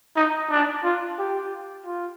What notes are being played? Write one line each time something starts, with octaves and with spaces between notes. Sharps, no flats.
D#4
D4
F4
G4
F4